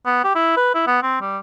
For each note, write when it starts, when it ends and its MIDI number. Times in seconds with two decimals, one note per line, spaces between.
0.06 0.24 59
0.24 0.33 67
0.35 0.56 64
0.57 0.71 71
0.75 0.82 64
0.87 0.99 59
1.02 1.18 60
1.21 1.38 55